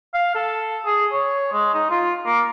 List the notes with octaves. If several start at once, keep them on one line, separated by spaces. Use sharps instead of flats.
F5
A4
G#4
C#5
G#3
D#4
F4
A#3